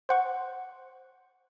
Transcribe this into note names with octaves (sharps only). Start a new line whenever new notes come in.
C5 F#5 C#6